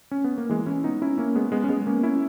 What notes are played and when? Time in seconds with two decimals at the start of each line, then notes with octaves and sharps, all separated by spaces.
0.11 C#4
0.24 B3
0.37 A#3
0.49 E3 G#3
0.66 C#4 E4
0.84 B3 D#4
1.02 C#4 E4
1.18 A#3 C#4
1.35 G#3 B3
1.52 G#3 B3
1.64 C#4
1.69 G#3 B3
1.86 A#3 C#4
2.03 C#4 E4